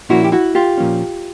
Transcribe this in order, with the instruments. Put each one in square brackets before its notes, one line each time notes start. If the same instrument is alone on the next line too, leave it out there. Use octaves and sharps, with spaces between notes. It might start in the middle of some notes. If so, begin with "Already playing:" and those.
[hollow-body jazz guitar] A#2 F3 A#3 C#4 E4 F#4
G4
E4 F#4
F4 G4
A#2 F3 A#3 C#4